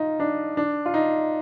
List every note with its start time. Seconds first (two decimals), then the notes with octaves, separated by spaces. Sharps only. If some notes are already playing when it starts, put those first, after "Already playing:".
Already playing: D#4 F4
0.20 D4
0.57 D4
0.86 F4
0.94 D#4